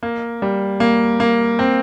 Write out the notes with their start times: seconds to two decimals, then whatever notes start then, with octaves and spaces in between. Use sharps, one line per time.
0.03 A#3
0.42 G3
0.80 A#3
1.20 A#3
1.59 C4